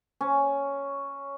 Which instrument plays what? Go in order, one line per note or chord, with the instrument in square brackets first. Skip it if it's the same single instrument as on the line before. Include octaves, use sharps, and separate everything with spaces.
[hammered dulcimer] C#4